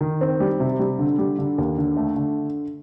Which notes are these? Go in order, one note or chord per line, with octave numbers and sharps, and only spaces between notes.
D#3
C4
G3
C3
G3
D3
G3
D3
D#2
D3
A3
D3